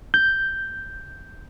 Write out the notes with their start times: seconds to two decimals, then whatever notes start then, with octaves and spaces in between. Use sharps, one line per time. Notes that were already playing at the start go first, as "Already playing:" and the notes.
0.14 G6